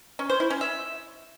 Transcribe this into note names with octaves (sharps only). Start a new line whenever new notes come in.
C#4
C5
E4
C#4
E5